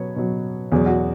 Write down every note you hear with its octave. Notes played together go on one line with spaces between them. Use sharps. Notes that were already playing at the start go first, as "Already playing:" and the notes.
Already playing: B2 F#3 B4 C#5
B2 F#3
E2 B2 F#3 G#4
F#4